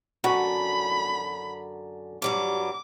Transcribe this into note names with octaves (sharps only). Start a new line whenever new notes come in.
F#2 D3 F#4 B5
G2 F#3 G3 D6